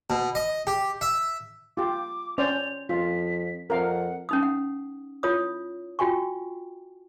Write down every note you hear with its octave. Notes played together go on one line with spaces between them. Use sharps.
B2
D#5
G4
E5
F4 G4 D6
C#4 C5 D5 F7
F2 F4 B6
F2 A#4 F5 F#5
C#4 D#4 D#6
F#5
E4 F4 C#5 D#6
F4 F#4 G5 G#5 C#6